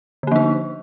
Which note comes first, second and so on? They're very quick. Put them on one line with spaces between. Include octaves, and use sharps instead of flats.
D3 A#3 F3 D#4